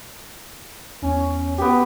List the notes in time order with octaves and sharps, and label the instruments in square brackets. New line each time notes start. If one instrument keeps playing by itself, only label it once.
[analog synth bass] E2 [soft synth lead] C#4
[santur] B3 G4